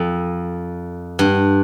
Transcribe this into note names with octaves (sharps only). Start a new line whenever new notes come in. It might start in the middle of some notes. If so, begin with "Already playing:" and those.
Already playing: F2
G2